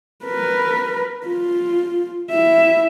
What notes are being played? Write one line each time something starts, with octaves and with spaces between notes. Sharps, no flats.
A#4 B4
F4
E4 E5